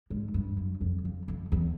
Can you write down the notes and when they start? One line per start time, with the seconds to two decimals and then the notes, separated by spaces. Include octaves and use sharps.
0.10 G#2
0.34 G2
0.57 F#2
0.81 F2
1.05 F2
1.28 F2
1.52 E2